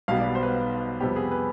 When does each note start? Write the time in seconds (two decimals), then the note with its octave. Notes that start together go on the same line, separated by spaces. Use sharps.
0.08 B1 B2 G3 B3 F5
0.20 D5
0.35 C5
0.43 B4
1.00 F2 C3 G3 B3 G4
1.16 G#4
1.31 B4